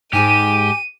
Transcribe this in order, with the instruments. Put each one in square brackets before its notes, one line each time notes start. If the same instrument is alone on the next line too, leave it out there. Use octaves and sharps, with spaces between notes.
[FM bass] G#2 [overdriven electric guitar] G4 [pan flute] G#5 [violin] D#7